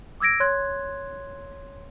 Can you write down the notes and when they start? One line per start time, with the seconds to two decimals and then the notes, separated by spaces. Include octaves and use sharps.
0.20 D6 E6 G#6 A#6 D7
0.40 C#5 C6 F#6 G#6